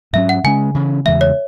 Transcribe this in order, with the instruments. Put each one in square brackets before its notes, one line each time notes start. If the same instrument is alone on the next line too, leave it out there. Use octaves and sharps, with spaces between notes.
[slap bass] G#2 F#3 C#4 [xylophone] E5
[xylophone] F#5
[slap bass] C#3 G#3 C#4 [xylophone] G#5
[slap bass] C#3 E3 C#4
[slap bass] E2 C#3 E3 G#3 [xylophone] E5
[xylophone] C#5